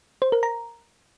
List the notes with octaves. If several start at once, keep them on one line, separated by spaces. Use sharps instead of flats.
C5
A#4
A#5